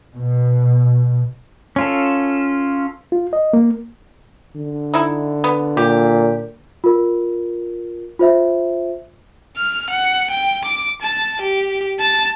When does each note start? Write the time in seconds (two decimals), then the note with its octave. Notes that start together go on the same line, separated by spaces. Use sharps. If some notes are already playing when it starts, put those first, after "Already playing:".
0.16 B2
1.76 C#4 F4 A4
3.12 F4
3.33 D#5
3.53 A#3
4.56 D3
4.94 D#4 E4
5.44 B3
5.77 A#2 G4
6.84 F4 A#4
8.20 F4 C5 E5
9.57 F6
9.90 F#5
10.31 G5
10.64 D6
11.02 A5
11.41 G4
12.00 A5